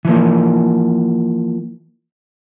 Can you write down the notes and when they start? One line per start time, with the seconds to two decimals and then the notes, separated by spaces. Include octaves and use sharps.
0.05 E3 F3 A#3